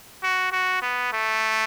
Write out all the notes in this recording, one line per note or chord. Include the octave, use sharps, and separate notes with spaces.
F#4
F#4
B3
A3